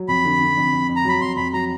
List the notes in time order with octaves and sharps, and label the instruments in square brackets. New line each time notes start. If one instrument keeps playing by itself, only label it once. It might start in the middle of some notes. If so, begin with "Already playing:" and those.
Already playing: [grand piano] F#3
[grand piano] F2 [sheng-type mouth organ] B5
[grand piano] D3
D3
F2
F2
F2
[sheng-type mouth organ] A#5
[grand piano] F#3 [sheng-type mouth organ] B5
[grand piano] F2 [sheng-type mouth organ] C6
[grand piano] F2 [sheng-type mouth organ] B5
[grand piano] F#3 [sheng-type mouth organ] A#5